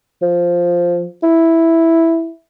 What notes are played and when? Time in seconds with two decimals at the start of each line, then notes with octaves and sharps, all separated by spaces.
0.22 F3
1.23 E4